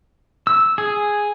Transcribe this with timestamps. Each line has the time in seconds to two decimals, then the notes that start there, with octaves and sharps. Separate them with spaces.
0.47 E6
0.78 G#4